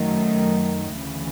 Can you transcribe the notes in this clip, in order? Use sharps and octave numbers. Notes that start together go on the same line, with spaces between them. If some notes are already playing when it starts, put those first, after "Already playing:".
Already playing: F#2 D#3 F#3 A3
D2 C#3 E3